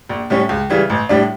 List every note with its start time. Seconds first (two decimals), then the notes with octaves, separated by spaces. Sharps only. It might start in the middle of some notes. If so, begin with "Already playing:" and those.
0.09 A#1
0.30 A2 G3 C#4
0.49 C#2
0.70 C#3 E3 G3
0.90 A1
1.09 A2 G3 D4